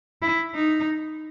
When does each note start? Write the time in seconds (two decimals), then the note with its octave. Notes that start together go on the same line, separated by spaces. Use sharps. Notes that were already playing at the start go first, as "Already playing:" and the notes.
0.22 E4
0.55 D#4